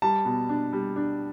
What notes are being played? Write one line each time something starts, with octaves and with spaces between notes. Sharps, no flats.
G3 A5
B2
D4
G3
D4